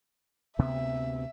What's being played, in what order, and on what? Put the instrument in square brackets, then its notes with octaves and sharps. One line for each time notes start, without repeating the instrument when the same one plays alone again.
[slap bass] D2 C3 B3 [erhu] E5